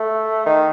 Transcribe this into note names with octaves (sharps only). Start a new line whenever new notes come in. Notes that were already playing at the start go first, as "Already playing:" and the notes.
Already playing: A3
D#3